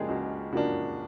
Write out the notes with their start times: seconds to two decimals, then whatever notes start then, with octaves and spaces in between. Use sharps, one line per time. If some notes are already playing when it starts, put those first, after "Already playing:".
Already playing: C#3 F3 G#3 A#3 D4 G4 G#4
0.08 C#2 F#4
0.53 C#3 F3 A#3 D4 F#4